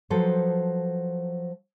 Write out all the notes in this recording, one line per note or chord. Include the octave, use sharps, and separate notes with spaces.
F3 F#3 A4 B4 C5